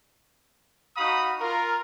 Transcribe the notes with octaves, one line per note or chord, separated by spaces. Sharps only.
D#4 F#4 F5 B5 D#6
F4 A#4